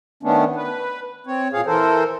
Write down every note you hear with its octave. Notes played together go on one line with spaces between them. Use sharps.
D#3 A3 B3 C#4 D4
B4
C4 C#5
A#2 G#4 C#5 F5
E3 A4 A#4 C5